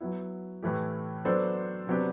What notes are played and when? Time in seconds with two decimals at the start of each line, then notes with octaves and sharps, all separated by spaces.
0.01 F#3 B3 E4
0.63 A2 E3 A3 E4 G4
1.25 F#3 B3 D4 A4 C5
1.87 C3 F#3 B3 D4 G4